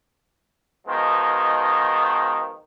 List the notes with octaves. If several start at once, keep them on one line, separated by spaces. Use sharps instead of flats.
B2 D#3 F3 G#3